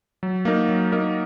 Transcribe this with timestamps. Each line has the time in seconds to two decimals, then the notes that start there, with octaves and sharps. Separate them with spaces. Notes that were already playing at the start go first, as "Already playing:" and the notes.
0.23 F#3
0.45 A#3 D#4 A#4
0.69 F#3
0.92 A#3 D#4 A#4